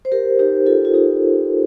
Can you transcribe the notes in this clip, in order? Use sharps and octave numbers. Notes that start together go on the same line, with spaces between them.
C5
G4 A#4
D#4 G4
F4 A4
F4
D#4 G4